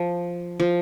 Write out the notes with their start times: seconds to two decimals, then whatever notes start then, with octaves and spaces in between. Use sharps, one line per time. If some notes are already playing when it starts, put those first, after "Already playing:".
Already playing: F3
0.60 F3